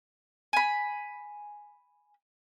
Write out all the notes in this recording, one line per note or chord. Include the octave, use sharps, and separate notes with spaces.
G#5 B5